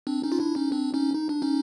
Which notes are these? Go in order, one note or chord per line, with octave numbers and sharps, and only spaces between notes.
C4 D4
C#4 D#4
F4
D4 E4
C#4 D#4
C4 D4
C#4 D#4
D#4
D4
C#4 D#4